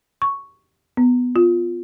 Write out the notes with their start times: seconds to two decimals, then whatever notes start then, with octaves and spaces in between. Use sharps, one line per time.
0.22 C#6
0.97 B3
1.36 F4